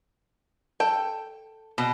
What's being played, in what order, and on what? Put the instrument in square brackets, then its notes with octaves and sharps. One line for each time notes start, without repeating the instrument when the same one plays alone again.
[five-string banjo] A4 G5
[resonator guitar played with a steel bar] B2